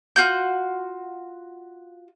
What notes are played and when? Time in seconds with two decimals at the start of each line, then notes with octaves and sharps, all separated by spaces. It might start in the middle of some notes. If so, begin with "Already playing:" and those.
0.16 F4 F#4 G6